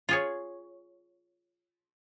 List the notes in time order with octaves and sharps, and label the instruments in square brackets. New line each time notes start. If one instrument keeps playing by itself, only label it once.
[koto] F4 G#4 C#5